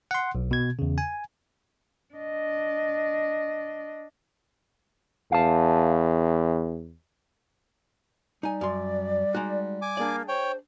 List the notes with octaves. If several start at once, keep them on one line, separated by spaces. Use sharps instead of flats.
F#5 C6
B1
B2 G#6
E2 C#3
G#5
D4 D#5
E2 F5 A5
G3 D#4 G#5
F#2 D5 C6
G#3 D#4 F#4
G#5 D6
A#3 D4 G#4 D5
C5 C#5 G5